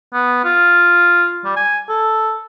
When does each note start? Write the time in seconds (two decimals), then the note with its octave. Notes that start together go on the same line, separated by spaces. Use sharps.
0.13 B3
0.44 F4
1.44 G3
1.56 G#5
1.89 A4